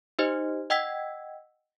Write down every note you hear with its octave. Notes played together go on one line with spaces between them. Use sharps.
D#4 G4 C5 D#5
D#5 F#5 G5 E6 G#6 B6